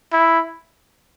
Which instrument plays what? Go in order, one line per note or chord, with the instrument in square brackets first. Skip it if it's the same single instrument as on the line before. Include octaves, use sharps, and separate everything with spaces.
[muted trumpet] E4